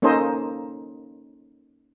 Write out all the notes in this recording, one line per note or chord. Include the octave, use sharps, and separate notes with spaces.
A#3 C#4 D#4 A4 C5 D#5